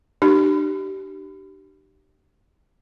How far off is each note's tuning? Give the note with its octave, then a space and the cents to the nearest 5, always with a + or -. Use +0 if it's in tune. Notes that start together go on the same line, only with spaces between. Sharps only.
D4 +40 G4 -30